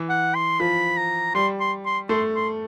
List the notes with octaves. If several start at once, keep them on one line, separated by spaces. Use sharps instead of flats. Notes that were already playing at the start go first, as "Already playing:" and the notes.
Already playing: E3
F#5
C6
F3 B5
A#5
G3 C6
C6
C6
A3 C6
C6